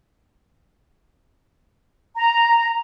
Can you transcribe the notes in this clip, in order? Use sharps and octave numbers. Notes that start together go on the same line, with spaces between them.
A#5